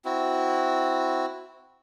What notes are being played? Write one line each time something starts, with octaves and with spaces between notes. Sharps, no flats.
C4 E4 F#4